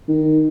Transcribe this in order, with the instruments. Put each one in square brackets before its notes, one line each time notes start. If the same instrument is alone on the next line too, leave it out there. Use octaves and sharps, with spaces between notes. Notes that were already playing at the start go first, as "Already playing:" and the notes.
[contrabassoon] D#3